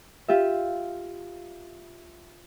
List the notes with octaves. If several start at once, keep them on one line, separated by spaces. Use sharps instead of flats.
F4 G4 E5